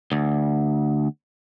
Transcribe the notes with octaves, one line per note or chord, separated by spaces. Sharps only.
D2